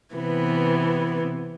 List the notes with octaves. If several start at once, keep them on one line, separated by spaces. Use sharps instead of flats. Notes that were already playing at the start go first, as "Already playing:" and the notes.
C3 E3 B3